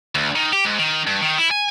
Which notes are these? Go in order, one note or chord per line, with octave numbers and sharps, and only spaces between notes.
D2
D#3
G4
G#2
D#3
G2
D#3
E4
G#5